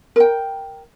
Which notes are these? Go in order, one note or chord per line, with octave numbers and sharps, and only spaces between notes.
A#4 G5